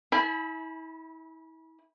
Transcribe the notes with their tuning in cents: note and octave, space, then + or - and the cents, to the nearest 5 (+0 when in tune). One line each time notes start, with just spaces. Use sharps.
E4 -35 G#5 +35 B5 +0